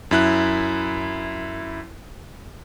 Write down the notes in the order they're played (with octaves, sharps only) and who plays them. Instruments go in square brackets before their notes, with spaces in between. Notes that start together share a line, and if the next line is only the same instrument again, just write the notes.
[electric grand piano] F#2 E4 F#6